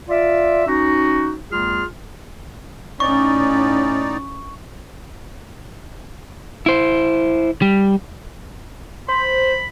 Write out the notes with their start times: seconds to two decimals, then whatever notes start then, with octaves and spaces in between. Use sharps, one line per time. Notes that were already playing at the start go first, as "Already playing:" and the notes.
0.09 F4 D5 E5
0.67 C#4 D#4 F#4
1.50 E2 G3 A3 F4 G#4 F6
3.00 A2 C#4 D#4 D5 C#6
6.66 E4 C5
7.62 G3
9.08 C5 B5